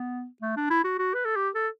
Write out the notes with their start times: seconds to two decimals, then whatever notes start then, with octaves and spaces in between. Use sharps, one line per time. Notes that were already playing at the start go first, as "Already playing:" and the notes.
Already playing: B3
0.42 A3
0.57 D4
0.70 E4
0.84 F#4
0.99 F#4
1.14 B4
1.25 A4
1.36 G4
1.55 A4